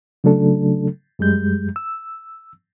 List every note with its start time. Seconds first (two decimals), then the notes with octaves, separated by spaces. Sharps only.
0.24 C#3 F#3 A3 D4 A4
1.19 F#2 G3 G#3 G6
1.76 E6